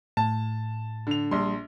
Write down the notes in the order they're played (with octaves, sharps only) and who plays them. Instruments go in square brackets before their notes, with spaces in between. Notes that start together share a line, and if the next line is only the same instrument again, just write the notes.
[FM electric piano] A2 [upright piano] A5
[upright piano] D3 F7
[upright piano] A#1 C6 [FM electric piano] G3